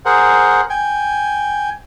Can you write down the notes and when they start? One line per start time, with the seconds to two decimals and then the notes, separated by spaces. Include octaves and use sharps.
0.05 G#4 A#4 C5 F#5
0.70 G5 G#5